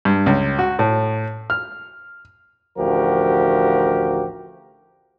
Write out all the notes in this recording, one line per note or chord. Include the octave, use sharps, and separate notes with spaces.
G2
C#2
F#4
A2
F6
A1 D2 F3 F#4 G4 A#4